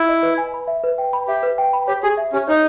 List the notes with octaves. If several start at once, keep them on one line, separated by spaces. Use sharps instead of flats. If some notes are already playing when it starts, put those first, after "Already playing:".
Already playing: E4
D#5
B4
G#5
B5
E5
B4
G5
B5
G4 E5
B4
G5
B5
G4 C#5
G4 G#4
E5
C#4 G4
D#4 C#5